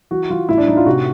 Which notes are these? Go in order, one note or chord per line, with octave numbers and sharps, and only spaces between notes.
E3 F#4
E3 F4
A2 E4
D4
A2 D#4
F4
C3 F#4